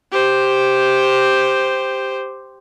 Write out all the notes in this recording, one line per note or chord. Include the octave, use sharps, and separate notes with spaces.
G4 C5